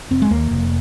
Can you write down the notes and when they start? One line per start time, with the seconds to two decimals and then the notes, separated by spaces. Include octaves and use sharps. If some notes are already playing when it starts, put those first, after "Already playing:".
0.11 F1 C4
0.22 G#3
0.30 D#2 A#3
0.51 F1